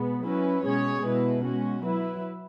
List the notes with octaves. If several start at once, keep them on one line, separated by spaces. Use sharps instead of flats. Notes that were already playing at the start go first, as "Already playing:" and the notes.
Already playing: B2 G#3 B3
F#3 C#4 E4 B4
B2 G#3 C#4 G#4 C#5
B2 G#3 E4 B4
G#3 C#4 F#4
F#3 E4 B4